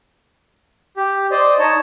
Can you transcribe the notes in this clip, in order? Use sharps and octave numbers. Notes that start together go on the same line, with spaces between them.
G4
C5 D5 D#5
D#4 C#5 A5